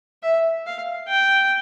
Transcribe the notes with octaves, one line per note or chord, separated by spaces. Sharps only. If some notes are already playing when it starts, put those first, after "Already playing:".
E5
F5
G5